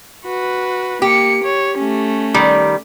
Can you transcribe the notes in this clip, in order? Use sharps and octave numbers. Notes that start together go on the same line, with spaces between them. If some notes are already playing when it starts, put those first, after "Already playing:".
F#4 B4
A#3 G4 C#7
C#5
A3 C#4
D#3 G3